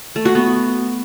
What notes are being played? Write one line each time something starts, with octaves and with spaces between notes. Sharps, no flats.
A3
F#4
B3